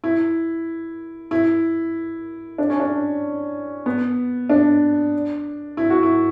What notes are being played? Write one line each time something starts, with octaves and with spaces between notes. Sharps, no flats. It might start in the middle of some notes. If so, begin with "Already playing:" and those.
E4
E4
D4
C#4
D4
B3
D4
E4
F#4
E4